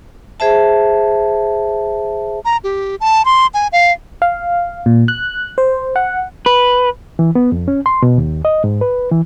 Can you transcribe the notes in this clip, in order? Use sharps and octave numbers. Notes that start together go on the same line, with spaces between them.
G#4 C5 E5 A5
A#5
G4
A5
C6
G#5
F5
F5
A#2
F#6
C5
F#5
B4
E3
B3
F2
C#4
C6
B2
D#2
D#5
G#2
B4
E3